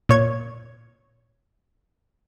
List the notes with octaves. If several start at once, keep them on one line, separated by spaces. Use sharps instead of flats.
A#2 C#5 G#6